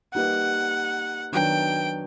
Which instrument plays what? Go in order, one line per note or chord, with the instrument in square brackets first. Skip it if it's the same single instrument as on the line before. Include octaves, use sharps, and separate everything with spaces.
[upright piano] G3 A#3 D#4 G4 B4 [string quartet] F#5
[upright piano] D#3 F#3 B3 D4 [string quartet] G5